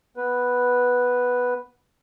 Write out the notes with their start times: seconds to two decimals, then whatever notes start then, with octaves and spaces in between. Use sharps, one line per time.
0.17 B3 B4